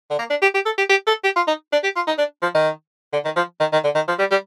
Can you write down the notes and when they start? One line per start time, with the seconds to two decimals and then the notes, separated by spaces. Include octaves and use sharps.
0.10 D3
0.19 A#3
0.30 D4
0.42 G4
0.55 G4
0.66 A4
0.78 G4
0.90 G4
1.07 A4
1.24 G4
1.36 F4
1.48 D#4
1.72 D4
1.84 G4
1.96 F4
2.07 D#4
2.18 D4
2.42 F3
2.55 D#3
3.13 D3
3.25 D#3
3.36 F3
3.60 D#3
3.73 D#3
3.84 D3
3.95 D#3
4.08 F3
4.19 G3
4.31 G3